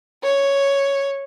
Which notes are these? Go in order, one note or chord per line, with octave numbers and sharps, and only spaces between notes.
C#5